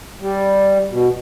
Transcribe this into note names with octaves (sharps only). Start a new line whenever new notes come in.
G3
B2